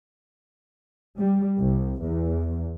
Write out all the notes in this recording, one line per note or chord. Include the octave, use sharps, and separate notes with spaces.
G3
C2
E2